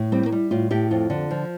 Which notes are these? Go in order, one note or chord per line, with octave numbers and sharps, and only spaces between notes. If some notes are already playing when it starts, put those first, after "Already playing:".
Already playing: A2
G3 C4
A#3
G3
A2 F4
A2 G4
F2 F4
D3
F3